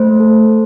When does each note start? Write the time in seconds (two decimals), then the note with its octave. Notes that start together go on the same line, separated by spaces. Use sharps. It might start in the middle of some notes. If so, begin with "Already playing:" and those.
Already playing: A3 C5
0.20 A4